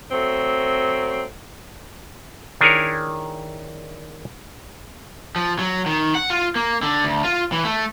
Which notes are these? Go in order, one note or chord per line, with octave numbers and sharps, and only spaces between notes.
F#3 A3 C4
D#3 D4 E4 G#4 A#4 C#5
F3
F#3
D#3
F#5
F4
A#3
D3
D2
F4
E3
A3